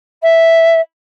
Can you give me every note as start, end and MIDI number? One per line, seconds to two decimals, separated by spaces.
0.22 0.80 76